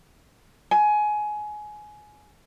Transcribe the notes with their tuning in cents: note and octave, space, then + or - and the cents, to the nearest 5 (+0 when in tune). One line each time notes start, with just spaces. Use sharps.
G#5 +20